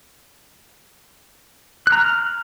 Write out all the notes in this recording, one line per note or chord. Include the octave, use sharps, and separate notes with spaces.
F#6
A#5
F6